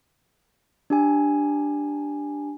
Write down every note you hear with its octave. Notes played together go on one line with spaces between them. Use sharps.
D4 G4 G#5